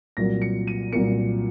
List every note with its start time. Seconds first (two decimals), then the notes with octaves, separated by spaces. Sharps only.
0.17 C2 A#2 F#3 A#3 A#6
0.42 C#7
0.67 D#7
0.93 C2 A#2 F#3 A#3 C#7